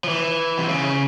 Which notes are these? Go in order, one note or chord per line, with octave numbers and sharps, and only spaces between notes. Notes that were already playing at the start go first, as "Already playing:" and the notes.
F3
E3
C3
C#3